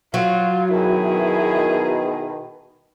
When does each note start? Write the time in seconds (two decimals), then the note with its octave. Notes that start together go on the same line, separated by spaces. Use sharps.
0.14 F#3 F4
0.71 B2 D#3 E4 G#4